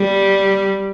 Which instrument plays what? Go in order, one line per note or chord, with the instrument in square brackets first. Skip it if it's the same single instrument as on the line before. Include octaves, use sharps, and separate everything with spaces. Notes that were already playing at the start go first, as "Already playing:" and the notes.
Already playing: [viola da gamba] G3